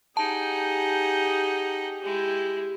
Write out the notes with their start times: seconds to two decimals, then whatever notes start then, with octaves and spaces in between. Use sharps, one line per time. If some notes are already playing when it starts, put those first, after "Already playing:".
0.17 D#4 G4 G#4 F#5 A5
2.03 G#3 E4 G4